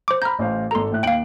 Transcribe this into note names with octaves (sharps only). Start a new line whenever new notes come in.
C5 D6
A#5 B5 F6 G6
A1 C5 F5
G#1 A4 A#5 C6
A2 E5 F#6
D#2 F5 G5 D7 F#7